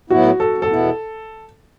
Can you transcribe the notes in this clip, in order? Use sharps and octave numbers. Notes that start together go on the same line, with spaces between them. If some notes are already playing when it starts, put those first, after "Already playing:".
A2 F#3 B3 E4 F#4
A4
A4
E2 B2 B3 E4